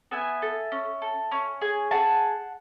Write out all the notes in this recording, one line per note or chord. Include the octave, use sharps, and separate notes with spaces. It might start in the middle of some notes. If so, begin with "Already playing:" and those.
B3 E5 G#5
A4
C#4
A4
C#4
G#4
G#4 F#5 A5